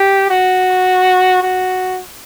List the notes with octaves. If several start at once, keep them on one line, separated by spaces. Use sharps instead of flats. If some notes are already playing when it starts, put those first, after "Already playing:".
Already playing: G4
F#4
F#4